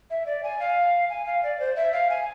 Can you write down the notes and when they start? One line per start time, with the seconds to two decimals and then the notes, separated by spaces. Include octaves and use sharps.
0.10 E5
0.26 D5
0.44 G#5
0.60 F5
1.10 G#5
1.26 F5
1.43 D5
1.60 C5
1.76 E5
1.93 F5
2.10 G#5